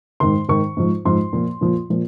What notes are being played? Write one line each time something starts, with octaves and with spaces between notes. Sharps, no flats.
G#2 D#3 C6
G#2 D#3 C#6
G#2 F3
G#2 F3 C6
A#2 F3
A#2 F3
A#2 F3